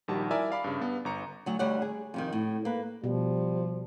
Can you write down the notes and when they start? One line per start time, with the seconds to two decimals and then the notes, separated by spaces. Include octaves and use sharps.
0.08 A#1 D#3 G3 F#4 G4 A5
0.31 E4 A#4 D5 E5 G#5
0.51 D5 F5 B5 D6
0.64 G2 C#3
0.81 G2 B3
1.05 G1 A#5 C#7
1.46 D2 F#3
1.59 D2 G3 D#4 C#5 F#5
1.82 G#4
2.14 F2 C3 D#3
2.33 A2
2.65 A#3 B4
3.04 B2 F3 G3